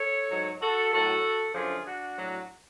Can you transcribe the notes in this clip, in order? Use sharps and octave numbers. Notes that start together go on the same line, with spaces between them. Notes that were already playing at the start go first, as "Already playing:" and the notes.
Already playing: A4 C#5
G#2 F#3
F#4 A4
A2 F#3 F#4 A4
F#2 D3 F3 F4 G#4
D4 F#4
A2 F#3